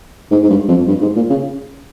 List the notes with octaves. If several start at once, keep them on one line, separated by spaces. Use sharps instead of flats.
G#2
G#2
G2
F2
G2
G#2
A#2
C#3